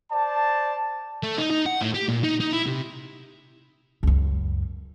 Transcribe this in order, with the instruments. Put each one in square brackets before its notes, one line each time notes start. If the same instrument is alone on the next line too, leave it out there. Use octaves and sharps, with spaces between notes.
[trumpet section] C5 D5 A5
[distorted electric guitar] A3
D#4
D#4
F#5
A2
G4
A#2
D#4
D#4
E4
C3
[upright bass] C#2 F#2